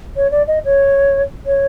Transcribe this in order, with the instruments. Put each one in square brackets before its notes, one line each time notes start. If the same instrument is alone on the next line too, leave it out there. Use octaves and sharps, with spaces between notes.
[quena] C#5
D5
D#5
C#5
C#5